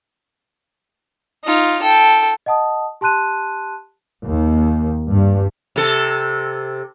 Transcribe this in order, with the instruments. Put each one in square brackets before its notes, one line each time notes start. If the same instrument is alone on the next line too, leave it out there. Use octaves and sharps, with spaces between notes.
[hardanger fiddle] D#4 F4
A4 G5
[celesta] D#5 F#5 A5 D#6
G4 A5 C6 F#6 D#7
[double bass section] D#2
G2
[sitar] C3 A4